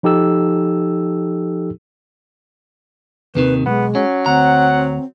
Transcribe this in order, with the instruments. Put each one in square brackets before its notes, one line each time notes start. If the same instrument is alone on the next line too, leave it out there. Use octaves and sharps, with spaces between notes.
[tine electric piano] F3 D#4 G4 A4 E6
[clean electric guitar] D#2 C3 D#3 [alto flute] B4
[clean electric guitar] B1 [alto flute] G#3 [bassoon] B3
[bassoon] F#3 [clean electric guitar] C#4
[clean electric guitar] D2 A#5 [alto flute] C4 [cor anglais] F#5